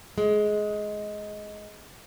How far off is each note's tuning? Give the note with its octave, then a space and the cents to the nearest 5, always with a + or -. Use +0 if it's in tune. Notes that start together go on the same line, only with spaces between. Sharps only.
G#3 +15